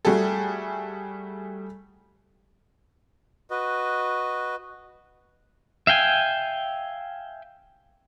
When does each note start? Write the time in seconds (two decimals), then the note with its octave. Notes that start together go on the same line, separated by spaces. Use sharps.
0.05 G3 A3 F#4 G#4 A4
3.50 F#4 B4 D#5
5.87 E5 F5 G5 G#5